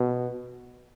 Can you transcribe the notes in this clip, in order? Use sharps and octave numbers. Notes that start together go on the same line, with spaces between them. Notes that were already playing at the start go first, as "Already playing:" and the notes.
Already playing: B2